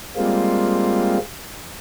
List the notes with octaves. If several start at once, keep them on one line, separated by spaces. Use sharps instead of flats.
G3 G#3 A#3 C4 F4